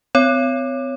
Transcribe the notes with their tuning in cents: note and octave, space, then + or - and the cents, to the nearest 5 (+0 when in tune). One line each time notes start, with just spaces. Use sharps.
C4 -40 C#5 +0